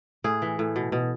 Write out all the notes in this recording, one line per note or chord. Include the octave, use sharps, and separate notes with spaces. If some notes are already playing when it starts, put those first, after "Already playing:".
A2 G#4
E3
A2
B2
B2